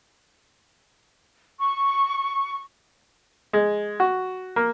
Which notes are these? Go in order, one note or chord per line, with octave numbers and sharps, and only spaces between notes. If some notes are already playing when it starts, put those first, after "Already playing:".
C#6
G#3
F#4
A#3